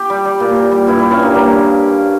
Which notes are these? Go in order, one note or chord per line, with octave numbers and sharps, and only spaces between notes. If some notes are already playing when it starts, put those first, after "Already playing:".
Already playing: G4
G3
G3
A#2
A#2
G3
G2 E4
G2 E4
C#4
G2 A#3
G3 A#3